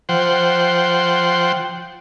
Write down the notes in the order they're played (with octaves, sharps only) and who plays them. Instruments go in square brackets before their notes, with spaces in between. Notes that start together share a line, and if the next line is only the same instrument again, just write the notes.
[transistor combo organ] F3 C5 F#5 G5